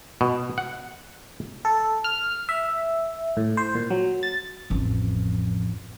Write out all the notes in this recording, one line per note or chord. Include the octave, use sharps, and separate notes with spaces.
B2
F#5
A4
F6
E5
A2
C5
A#2
F#3
A6
A1 F2